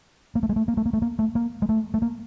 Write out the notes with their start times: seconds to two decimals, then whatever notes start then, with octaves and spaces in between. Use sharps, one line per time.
0.35 A#3
0.43 A3
0.49 G#3
0.56 A3
0.68 A#3
0.77 A3
0.86 A#3
0.93 A3
1.02 A#3
1.19 A3
1.35 A#3
1.62 G#3
1.69 A3
1.94 A3
2.02 A#3